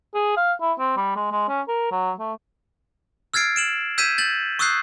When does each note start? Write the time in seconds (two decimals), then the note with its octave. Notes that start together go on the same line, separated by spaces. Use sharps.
0.14 G#4
0.37 F5
0.61 E4
0.79 C4
0.97 G3
1.16 G#3
1.32 G#3
1.48 C#4
1.68 A#4
1.91 F#3
2.20 A3
3.34 E6 F6 G#6 A6 C7 D7
3.56 D7 E7 F#7
3.98 E6 G6 G#6 B6 D#7 E7
4.18 G6 A6 F#7
4.59 C#6 D#6 E6 F#6 G6 C7